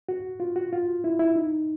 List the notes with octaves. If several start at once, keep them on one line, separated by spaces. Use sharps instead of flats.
F#4
F4
F#4
F4
E4
E4
D#4